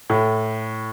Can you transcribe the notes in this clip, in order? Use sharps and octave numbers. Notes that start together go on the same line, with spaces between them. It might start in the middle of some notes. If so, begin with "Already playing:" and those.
A2